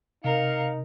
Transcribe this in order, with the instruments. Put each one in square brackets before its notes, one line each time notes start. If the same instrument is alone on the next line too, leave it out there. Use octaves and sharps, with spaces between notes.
[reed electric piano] C3 [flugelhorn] D#4 [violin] A#4 C#7 [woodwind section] F5